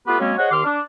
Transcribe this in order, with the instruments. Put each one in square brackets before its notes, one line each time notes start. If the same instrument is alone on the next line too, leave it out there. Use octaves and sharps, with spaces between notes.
[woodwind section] A3 B3 F4 G4 B4
F#3 G#3 A#3 C4 C#4
G#4 C5 C#5 D#5 F#5
D#2 D#3 G4 C6 D6 F6
D4